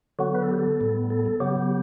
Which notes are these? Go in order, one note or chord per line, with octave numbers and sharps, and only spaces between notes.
D3 F#3 B3 F#4
B4
A4
G4
A4
A2 G3 B3
A4
A4
C#3 F#3 B3 G4
G4